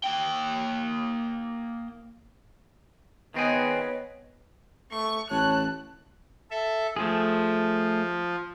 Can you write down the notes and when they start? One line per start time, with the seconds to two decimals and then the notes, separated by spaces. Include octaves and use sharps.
0.04 A#3 G5
3.34 D#3 B3 C4 G#4 B4 C#5 D#5
4.92 A3 C#6
5.30 A1 C#5 A5 F#6
6.51 A4 E5
6.96 F3 A3 G#4